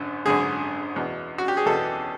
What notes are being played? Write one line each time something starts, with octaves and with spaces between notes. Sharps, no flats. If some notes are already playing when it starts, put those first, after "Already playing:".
Already playing: G#1 F#2 D3
G#1 F#2 D3 G#4
E2 B2
F#4
G4
G#4
E2 B2 A4